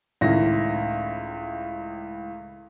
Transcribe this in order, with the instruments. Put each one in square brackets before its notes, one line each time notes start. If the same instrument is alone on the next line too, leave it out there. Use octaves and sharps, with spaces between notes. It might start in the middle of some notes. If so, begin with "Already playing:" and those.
[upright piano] C#2 A2 D#3 E4 A#6